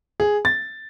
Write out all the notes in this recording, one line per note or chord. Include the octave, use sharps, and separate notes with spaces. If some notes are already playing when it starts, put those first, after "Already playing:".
G#4
A6